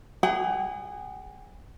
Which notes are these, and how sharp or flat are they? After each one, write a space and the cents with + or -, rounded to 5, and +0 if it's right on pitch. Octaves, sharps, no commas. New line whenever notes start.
G#4 -20 F#5 +40